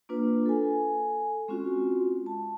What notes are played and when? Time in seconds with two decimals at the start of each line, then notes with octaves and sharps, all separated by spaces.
0.09 A#3 D4 F4 B4
0.46 A4 G#5
1.48 G#3 C4 C#4 F4 F#4
2.26 A5